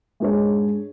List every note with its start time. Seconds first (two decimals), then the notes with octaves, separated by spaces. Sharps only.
0.20 G#2 G#3 D4 G#4 C#5